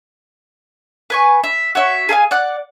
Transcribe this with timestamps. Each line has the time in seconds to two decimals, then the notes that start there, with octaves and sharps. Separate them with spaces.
1.10 B4 G#5 C#6
1.44 E5
1.75 F#4 C#5 E5
2.09 G#4 A4 F5 G#5
2.31 D5 F#5 F#6